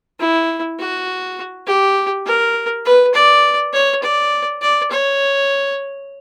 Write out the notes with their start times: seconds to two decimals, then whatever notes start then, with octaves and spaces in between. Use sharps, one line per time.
0.20 E4
0.79 F#4
1.67 G4
2.26 A#4
2.85 B4
3.14 D5
3.73 C#5
4.03 D5
4.61 D5
4.91 C#5